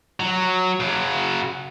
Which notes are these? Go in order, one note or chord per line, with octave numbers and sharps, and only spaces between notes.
F#3
C#3 F#3